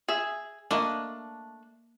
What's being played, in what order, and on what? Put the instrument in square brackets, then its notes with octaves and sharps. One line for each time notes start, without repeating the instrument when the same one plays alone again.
[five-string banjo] G#4 E5
[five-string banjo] A3 D4 [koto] A#3 D#5